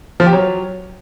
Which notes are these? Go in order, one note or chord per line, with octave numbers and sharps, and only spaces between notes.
F3
G4
F#3